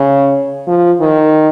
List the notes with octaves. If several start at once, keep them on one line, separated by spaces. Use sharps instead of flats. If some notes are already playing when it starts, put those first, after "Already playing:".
Already playing: C#3
F3
D#3